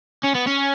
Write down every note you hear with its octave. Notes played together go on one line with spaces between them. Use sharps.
C#4
B3
C#4